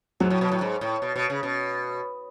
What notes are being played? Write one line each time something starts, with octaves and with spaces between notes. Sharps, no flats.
G#2 F#3
A2
B2
A2
G#2
A2
B2
B2
C#3
B2